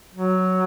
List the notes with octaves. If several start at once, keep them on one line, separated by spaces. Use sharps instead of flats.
F#3